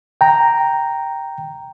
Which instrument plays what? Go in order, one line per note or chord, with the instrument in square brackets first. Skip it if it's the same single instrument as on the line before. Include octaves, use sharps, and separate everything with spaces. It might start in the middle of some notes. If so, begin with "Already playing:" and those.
[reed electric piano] G5 A#5